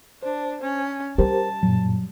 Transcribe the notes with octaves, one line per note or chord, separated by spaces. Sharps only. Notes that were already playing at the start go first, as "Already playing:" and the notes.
D4 C5
C#4
G3 G4 A#4 C5 A5
F#2 A#2 F#3